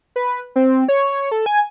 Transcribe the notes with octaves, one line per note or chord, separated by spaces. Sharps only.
B4
C4
C#5
A4
G#5